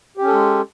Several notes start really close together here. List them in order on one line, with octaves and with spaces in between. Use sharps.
G4 C#4 A4 G#3